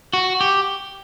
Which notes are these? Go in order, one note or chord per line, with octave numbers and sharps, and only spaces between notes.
F#4
G4